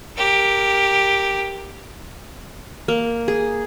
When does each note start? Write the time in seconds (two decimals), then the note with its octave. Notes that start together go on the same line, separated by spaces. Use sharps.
0.17 G4 A#4
2.88 A#3
3.28 G#4